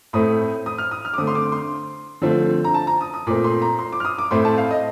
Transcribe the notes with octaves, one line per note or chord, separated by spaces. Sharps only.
A2 A3 C4 D#6
D#6
F6
D#6
F6
D6
D3 A3 C4 D#6
C6
D6
C6
D3 F3 A3 C4
A#5
A5
A#5
D#6
D#6
A#2 A3 C4 D6
C6
A#5
C6
D6
F6
D#6
D6
A2 A3 C4 C6
A5
F5
D#5